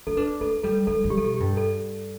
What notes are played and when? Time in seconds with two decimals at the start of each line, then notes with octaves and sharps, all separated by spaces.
0.07 E4 A4
0.17 D4 B4
0.40 A3 A4
0.63 G3 A4
0.87 G3 A4
1.04 G3
1.10 G4
1.17 A4
1.22 B2 G4
1.34 G4
1.40 G2
1.57 A4